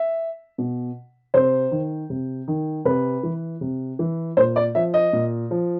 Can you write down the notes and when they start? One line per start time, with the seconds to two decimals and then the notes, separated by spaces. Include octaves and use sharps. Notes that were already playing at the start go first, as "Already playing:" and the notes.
Already playing: E5
0.58 B2
1.34 C3 C5
1.71 D#3
2.10 C3
2.48 D#3
2.85 C3 B4
3.23 E3
3.61 C3
3.99 E3
4.37 A#2 C5
4.56 D5
4.75 F3 E5
4.94 D#5
5.13 A#2
5.51 F3